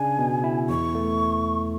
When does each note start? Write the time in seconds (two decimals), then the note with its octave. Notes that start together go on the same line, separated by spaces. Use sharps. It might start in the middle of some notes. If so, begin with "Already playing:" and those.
Already playing: C#3 D4 G#5
0.19 B2
0.44 E4
0.69 E2 C#6
0.95 A3